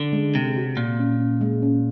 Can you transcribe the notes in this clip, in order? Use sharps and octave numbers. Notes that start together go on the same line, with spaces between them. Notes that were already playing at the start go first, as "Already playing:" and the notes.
Already playing: D3
G#3
C3 G#3
F#4
A#2 F#4
C#4
C#4
G#3
C#4